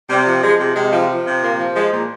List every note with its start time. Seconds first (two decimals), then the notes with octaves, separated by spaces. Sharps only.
0.09 C3 G3
0.26 F3
0.43 F3 G#3
0.59 C3
0.76 C3 G#3
0.92 F3
1.09 F3
1.26 C3
1.42 A#2 A#3
1.59 F3
1.75 F3 G#3
1.92 A#2